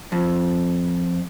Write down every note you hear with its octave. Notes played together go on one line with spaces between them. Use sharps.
F2